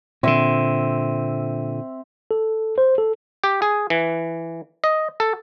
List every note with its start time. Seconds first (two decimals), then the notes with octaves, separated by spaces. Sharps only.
0.23 A#2 D3 C4 E5
2.31 A4
2.78 C5
2.98 A4
3.44 G4
3.62 G#4
3.90 E3
4.84 D#5
5.20 A4